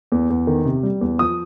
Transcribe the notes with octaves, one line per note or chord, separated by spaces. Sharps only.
E2
E2
D#3
C3
G3
E2
F3 D#6